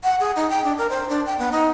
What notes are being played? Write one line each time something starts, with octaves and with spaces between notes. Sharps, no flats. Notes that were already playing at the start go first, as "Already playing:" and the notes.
F#5
G#4
D#4
G5
D4
A#4
C5
D4
G5
B3
D#4